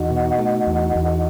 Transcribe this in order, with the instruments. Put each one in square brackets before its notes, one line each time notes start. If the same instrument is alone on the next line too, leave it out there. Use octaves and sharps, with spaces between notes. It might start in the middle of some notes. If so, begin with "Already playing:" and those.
Already playing: [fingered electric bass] E2 [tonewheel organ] D#4 F#4
[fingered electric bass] B2
A3
E2
E2